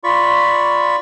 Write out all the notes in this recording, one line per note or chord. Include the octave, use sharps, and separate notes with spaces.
F4 D5 B5 C#6